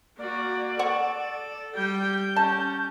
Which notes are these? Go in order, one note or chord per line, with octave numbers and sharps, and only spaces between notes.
A#3 F#4 D5
A4 F#5 C#6
G3 G5 G6
C#4 A5